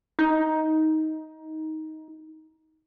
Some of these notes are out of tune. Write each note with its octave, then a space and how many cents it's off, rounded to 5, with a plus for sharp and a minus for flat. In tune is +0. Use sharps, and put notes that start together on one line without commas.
D#4 +15